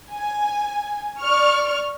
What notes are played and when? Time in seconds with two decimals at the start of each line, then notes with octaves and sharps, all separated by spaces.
0.12 G#5
1.20 D5 C#6 F6